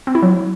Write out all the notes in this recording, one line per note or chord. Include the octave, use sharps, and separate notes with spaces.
C4
E4
F#3